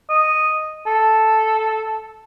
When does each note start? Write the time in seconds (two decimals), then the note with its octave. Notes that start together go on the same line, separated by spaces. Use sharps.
0.10 D#5
0.87 A4